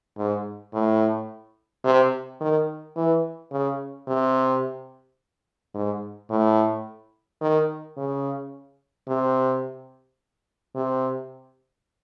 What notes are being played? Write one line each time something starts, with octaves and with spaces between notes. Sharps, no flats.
G#2
A2
C3
D#3
E3
C#3
C3
G#2
A2
D#3
C#3
C3
C3